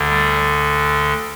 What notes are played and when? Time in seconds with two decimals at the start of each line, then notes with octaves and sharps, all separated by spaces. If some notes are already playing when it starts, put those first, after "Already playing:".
Already playing: D2 D3
0.09 G3